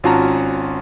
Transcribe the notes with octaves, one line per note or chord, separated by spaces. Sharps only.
G#1 C#4 F4 F#4 A5 A#5